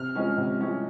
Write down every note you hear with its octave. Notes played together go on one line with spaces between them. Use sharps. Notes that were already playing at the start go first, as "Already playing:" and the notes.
Already playing: C3 F6
F3 G#3 C#4
C3
F3 G#3 C#4